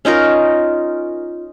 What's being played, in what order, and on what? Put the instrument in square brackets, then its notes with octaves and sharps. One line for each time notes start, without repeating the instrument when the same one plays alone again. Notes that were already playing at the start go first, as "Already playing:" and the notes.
[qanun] C#4 D#4 F4 A#4